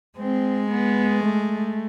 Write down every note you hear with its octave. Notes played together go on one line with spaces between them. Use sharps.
G#3 C4
B3
A3